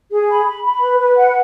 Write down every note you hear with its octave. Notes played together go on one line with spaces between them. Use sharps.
G#4
B5
B5
B5
B4
B4
F#5